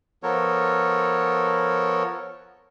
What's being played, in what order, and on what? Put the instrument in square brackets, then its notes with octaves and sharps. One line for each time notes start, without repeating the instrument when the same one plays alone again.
[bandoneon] F3 B3 A4 A#4 C#5